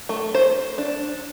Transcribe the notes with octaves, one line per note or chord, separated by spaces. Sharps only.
A3
C5
D4